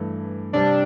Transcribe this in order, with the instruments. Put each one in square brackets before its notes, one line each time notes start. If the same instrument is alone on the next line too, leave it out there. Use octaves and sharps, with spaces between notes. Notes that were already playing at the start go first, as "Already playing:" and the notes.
Already playing: [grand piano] G2 E3 A3
[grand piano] C3 G3 C4 [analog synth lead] D4